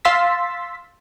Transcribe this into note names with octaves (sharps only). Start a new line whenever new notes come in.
F5 C6 E6 A6 B6